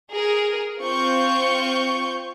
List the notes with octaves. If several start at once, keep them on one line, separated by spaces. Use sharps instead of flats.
G#4 A#4
C4 F4 C#6 G6